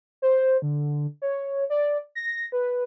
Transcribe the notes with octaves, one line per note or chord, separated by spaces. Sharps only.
C5
D3
C#5
D5
A#6
B4